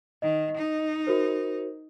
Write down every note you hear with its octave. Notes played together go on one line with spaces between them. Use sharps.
D#3 D#5
D#4
F#4 A#4 C5